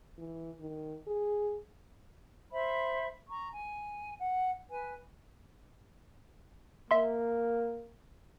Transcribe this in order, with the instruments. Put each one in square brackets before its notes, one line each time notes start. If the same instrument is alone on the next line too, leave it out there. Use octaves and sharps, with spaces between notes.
[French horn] E3
D#3
G#4
[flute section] C5 E5 B5
A#5 C#6
G#5
F#5
B4 G#5
[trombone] A#3 [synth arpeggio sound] E5 C6